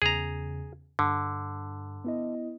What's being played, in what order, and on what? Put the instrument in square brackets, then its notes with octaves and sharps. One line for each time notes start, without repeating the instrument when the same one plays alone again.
[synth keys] E2 C#3 [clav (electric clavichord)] G#4 A#5
[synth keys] G2 [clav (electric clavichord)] D3
[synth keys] B3 E4 D#5